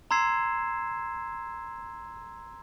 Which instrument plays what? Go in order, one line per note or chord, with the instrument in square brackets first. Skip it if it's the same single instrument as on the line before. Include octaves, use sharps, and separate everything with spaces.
[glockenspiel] A#5 C6 E6 G#6 C7 E7